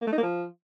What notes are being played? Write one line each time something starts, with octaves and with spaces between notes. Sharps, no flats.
A#3
A3
D#4
A#3
F3